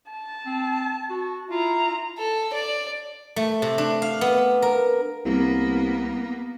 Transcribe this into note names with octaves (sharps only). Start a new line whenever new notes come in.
A5
C4
F#4
E4 F4 A#5
A4
D5
A3
C3
D4
F5
B3
A#4
C2 A#3 B3